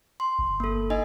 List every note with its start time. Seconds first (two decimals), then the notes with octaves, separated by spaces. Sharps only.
0.20 C6
0.39 G1
0.60 A#3 A4
0.90 D#4 D#5 G#5